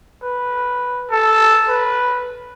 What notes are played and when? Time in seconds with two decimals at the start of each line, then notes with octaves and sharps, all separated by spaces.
0.22 B4
1.10 A4
1.68 B4